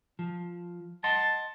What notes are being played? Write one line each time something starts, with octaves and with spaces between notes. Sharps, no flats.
F3
D#5 F#5 A5 C6